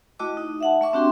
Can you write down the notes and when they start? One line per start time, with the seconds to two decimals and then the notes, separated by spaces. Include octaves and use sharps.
0.19 A3 E4 F#4 D#5 G5 D6
0.37 D#4
0.60 E5 F#5 A5
0.81 A3 E5 C#6 D6
0.93 C4 D4 F#4 G4 G5 C6